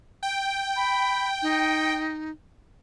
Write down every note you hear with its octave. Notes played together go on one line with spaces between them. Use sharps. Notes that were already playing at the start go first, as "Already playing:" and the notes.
G5
B5
D#4